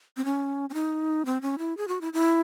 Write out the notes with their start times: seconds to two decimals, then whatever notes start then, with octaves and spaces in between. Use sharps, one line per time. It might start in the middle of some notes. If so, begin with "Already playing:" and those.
0.17 C4
0.25 C#4
0.70 C#4
0.74 D#4
1.26 C4
1.42 C#4
1.58 E4
1.77 G#4
1.88 F#4
2.01 E4
2.13 E4